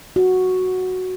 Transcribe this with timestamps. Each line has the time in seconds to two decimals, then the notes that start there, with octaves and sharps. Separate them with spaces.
0.16 F#4